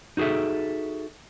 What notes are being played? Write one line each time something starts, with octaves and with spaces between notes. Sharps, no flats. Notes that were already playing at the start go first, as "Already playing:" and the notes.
D#4 F#4 G#4 A4 E5